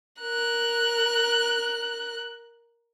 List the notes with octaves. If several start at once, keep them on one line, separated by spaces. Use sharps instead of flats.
A#4 F#6